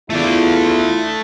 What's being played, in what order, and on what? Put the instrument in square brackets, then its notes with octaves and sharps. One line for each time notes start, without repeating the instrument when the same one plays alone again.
[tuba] E2 [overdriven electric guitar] A3 D5 [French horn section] E4 F4